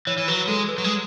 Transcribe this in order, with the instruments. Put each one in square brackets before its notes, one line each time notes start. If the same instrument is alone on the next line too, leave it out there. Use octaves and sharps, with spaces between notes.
[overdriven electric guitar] E3 [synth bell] C#5
[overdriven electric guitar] E3
[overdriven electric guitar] F#3 [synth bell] B4
[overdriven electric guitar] G#3 [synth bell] A4
[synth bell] B4
[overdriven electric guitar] F#3
G#3